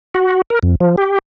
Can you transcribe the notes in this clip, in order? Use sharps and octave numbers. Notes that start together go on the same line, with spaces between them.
F#4
A#4
F2
F3
G4